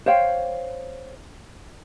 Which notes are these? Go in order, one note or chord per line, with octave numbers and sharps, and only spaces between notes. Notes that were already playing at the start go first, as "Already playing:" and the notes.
C5 C#5 F5 G5